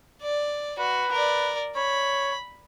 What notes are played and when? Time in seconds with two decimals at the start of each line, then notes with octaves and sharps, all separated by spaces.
0.22 D5
0.78 F#4 B4
1.12 A#4 D5
1.76 C#5 B5